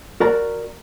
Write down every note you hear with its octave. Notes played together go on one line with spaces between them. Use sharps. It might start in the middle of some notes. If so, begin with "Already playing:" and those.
F#4 A#4 D5 A#5